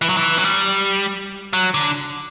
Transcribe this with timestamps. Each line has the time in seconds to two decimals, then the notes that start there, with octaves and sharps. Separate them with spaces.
0.01 E3
0.09 F#3
0.17 E3
0.38 F#3
0.45 G3
1.53 F#3
1.74 D3